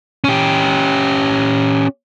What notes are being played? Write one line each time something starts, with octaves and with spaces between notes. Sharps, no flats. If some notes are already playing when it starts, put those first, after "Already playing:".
C#4 G4